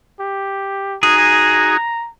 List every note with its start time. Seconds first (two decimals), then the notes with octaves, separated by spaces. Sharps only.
0.20 G4
1.03 D#4 F#4 G#4 G#5 A#5